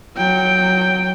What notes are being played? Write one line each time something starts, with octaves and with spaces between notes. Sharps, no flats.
F#3 G5